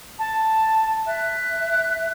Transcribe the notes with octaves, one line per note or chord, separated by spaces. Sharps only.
A5
E5 F#6